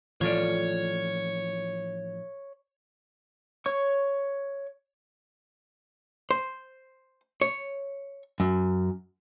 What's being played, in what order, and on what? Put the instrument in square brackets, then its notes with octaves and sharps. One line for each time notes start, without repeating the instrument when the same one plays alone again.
[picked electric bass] A2 E3 F3 [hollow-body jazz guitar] F4 A4 D5 [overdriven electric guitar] C#5
[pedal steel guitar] C#5 C#6
[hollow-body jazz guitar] C5
C#5
F#2